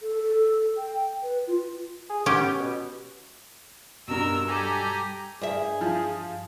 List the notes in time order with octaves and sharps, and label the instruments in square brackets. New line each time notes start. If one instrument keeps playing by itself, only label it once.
[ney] A4
A4
G5
B4
F4
[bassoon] G#4
[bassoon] B3 [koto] C#4 G4
[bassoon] B2
[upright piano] G2 B2 [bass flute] G3 [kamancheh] A#4 E6
[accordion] G4 G#5 A#5 [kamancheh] A4
[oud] G2 E5 [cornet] G#4
[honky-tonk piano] F3